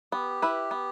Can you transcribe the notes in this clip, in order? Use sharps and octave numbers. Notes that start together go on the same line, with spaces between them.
B3 G4
E4 B4
B3